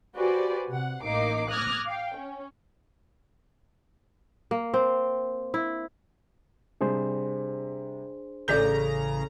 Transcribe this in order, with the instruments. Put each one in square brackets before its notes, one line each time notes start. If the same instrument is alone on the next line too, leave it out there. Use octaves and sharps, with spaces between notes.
[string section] F#4 G4 B4 C5 D5 G#5
C3 F#5
A1 A#3 D#4 D6 C7
D6 D#6 F6 F#6 G#6 A#6
F5 G5
C#4
[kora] A#3
C4
E4
[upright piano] C3 G3 [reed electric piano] D4 G#4 C5
[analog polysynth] A1 C#3 A#5 [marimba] A4 G6 [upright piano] D5 B6 G7